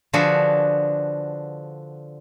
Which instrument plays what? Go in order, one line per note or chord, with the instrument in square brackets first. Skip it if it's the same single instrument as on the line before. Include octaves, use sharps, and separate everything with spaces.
[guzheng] D3 F3 D4 F#4 G#4 B4